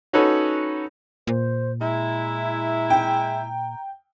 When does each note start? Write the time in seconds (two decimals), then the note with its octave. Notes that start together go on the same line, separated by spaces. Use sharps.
0.13 C#4 D#4 F#4 A4 B4 C#5
1.27 A#2 C5
1.81 G#3 E4 A#5
2.90 G5